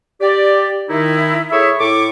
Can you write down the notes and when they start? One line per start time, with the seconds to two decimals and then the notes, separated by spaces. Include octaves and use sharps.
0.21 G4 D5
0.89 D#3 D#4 E4
1.51 E4 G#4 A4 C#5 E5
1.80 A2 E4 A4 C#6 D6